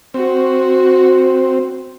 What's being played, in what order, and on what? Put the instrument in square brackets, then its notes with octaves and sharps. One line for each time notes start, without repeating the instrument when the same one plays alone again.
[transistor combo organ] C4 [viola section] F#4